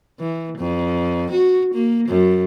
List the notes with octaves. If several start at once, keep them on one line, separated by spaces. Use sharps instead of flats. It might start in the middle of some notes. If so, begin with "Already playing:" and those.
E3
F2
F#4
A#3
F#2